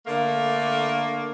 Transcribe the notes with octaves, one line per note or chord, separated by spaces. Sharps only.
D3 A3 A#3